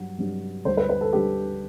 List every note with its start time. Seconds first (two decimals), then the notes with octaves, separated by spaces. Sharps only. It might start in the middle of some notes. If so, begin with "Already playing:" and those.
Already playing: G2 F#3
0.18 G2 F#3
0.65 D2 D3 G3 C5
0.77 B4
0.89 B4
1.01 A4
1.13 D3 G3 G4